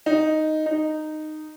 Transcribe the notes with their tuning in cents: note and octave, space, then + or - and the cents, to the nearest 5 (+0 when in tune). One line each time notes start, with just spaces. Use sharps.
D#4 +0
D#4 -10